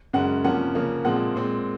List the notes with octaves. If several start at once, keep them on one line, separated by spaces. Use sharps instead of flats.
F#2 C#3 G#3 C#4 F#5
C3 F3 A#3 C#4 F#5
C#3 F3 A#3 C#4
A#2 F3 G#3 C4 F#5
A#2 G#3 C4